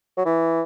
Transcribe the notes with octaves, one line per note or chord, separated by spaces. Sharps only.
F#3
E3